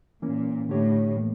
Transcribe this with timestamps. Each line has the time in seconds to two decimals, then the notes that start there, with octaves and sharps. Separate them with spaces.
0.22 A#2 E3 A#3 C#4
0.69 A2 D3 A3 D4 G4 C#5
1.15 A2 E3 A#3